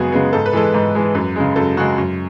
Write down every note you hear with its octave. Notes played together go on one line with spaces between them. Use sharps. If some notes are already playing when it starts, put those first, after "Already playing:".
Already playing: F#2 C#3 G#3 B3 F#4 G#4
C#3 G#3 B3
G#2 A4
B4
E3 G#3 A4
G#2
E3 G#3
F#2 B4
C#3 G#3
F#2 A4
C#3 G#3 F#4
F#2